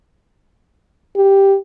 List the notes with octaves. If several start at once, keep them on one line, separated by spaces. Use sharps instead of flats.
G4